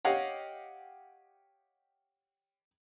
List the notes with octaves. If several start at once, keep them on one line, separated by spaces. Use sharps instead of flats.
G4 C#5 D#5 F5 F#5